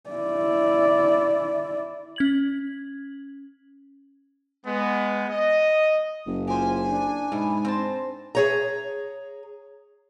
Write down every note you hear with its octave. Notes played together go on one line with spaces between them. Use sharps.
E4 D5
C#4 G#6 F#7
G#3 B3
D#5
F#1
F4 G4 C5 G#5
D4
G#2 B2 E4
C4 C5 A5
G#4 C#5 A#5